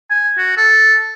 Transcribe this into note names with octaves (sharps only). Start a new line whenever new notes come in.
G#5
F#4
A4